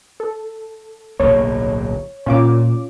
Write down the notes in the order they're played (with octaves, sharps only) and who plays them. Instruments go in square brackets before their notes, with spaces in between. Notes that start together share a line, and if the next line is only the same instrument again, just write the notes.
[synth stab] A4
[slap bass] D1 B1 A#3 [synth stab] C#5
[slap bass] A#2 [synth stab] C#4 F4 D6